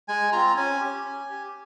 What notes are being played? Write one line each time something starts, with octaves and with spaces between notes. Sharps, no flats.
G#3 G#5
C4 F4 A#5
C#4 G#5
G4
C#4
G4